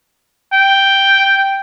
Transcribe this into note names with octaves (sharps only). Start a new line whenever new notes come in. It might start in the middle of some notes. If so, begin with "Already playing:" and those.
G5